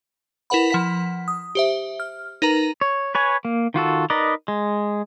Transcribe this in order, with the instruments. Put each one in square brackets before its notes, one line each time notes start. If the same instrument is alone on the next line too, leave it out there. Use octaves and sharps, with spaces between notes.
[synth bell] E4 A#4 B4 F#5 B5
F3 F#5 B6
D#6
G4 C5 E5
F6
D#4 A#4 B4 A#5
[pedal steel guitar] C#5
B4 C#5 G#5
A#3
D#3 F4 F#4 A4
D#4 A#4 B4 D5 D#5
G#3